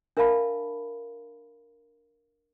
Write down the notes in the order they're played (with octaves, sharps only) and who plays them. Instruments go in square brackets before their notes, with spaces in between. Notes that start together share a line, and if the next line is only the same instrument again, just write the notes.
[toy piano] D4 A#4 E5 F5 A5 B5